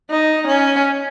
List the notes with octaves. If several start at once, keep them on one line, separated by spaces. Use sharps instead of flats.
D#4
C#4